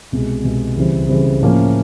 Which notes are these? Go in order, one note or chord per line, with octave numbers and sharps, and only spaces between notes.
C2 B2 G#3
C2 B2 G#3
C#2 C#3 E3 G3 C4
C#2 C#3 E3 G3 C4
A2 F3 A#3 C#4